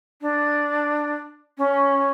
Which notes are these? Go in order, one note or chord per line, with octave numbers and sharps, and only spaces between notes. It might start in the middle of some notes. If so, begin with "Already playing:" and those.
D4
C#4